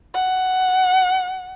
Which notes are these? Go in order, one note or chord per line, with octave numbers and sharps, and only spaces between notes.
F#5